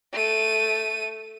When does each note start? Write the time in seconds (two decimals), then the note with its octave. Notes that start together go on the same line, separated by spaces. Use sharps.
0.13 A3 D#7